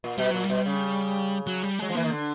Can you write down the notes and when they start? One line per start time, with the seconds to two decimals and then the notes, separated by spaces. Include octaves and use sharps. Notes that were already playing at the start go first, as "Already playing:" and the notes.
0.04 A#2
0.18 B2 G3
0.31 A#2 F#3
0.44 G3
0.50 B2
0.66 C#3
1.47 F#3
1.63 G3
1.79 F#3 G#3
1.90 F3
1.95 E3 A#3
2.04 D#3
2.12 D3